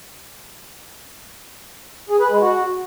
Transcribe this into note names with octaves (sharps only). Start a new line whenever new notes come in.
G#4
B4
G#3
F#4